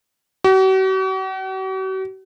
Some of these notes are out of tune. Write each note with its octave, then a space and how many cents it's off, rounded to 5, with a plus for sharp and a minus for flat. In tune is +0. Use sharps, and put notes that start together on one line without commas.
F#4 +45